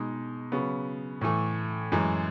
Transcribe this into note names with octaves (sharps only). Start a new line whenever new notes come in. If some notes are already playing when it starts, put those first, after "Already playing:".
Already playing: B2 G#3 D#4
C#3 F#3 B3
A2 E3 A3
F#2 E3 G#3